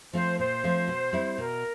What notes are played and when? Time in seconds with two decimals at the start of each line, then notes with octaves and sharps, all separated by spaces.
0.13 F3 A3 C4 F4 C5
0.39 A#2 C5
0.64 F3 A3 C4 F4
0.88 B2
1.13 G3 C4 E4
1.38 B2 A#4